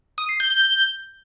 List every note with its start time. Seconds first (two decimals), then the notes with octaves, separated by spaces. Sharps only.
0.18 D#6
0.29 C7
0.40 G6